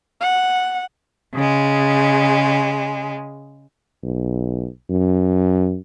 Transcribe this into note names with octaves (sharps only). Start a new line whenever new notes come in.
F#5
C#3 G#3
B1
F#2